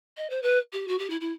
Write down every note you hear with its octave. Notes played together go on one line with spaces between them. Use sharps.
D#5
C5
B4
G4
F#4
G4
E4
E4